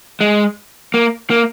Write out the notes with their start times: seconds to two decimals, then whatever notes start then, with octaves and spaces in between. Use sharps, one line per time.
0.21 G#3
0.94 A#3
1.30 A#3